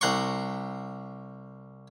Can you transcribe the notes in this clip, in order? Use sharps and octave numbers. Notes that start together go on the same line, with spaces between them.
C2 F#5 A#5 C6 C#6